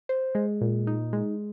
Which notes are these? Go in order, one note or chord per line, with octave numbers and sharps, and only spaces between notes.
C5
G#3
A#2
D#4
G#3